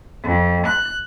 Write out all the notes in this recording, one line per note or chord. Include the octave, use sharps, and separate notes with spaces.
F2
F#6